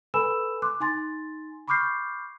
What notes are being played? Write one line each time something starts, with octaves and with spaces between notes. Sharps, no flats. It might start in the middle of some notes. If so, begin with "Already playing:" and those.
A4 B4 G#5 B5 E6 E7
C6 D6 F#6
D#4 G#5 C6 A6
B5 C#6 D6 F6 G6 C7